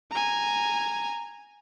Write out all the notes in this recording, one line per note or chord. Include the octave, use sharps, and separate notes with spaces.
G#5 A#5